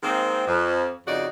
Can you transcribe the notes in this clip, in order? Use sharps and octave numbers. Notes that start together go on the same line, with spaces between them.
D#3 G#3 A#3 C4
F2
F2 C#3 D#4 F#4 D5